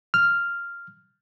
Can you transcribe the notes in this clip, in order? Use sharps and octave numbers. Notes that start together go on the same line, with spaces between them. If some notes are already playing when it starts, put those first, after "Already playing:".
F6